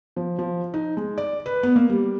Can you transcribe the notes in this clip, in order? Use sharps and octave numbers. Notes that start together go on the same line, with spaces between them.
F3
F3
D#4
G#3
D5
B4
B3
A#3
G3